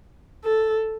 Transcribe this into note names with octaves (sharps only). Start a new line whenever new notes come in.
A4